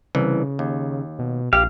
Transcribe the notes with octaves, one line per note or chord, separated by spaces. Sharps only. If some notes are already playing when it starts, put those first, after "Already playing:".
C2 C#3 E3
D#2
B2
A#1 G4 F5